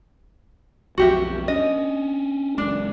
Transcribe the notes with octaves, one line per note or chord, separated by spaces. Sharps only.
B1 F2 F#4 G4 E5
C#4 D4 D#5
F#1 G#3 D4